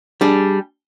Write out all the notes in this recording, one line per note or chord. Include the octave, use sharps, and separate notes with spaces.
G3 D4 G#4